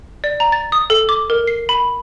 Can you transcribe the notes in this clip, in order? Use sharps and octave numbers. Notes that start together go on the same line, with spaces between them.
D5
A#5
A6
D#6
A4
D6
A#4
C7
B5